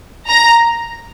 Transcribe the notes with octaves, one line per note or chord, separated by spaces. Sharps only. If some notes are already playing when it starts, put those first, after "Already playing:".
A#5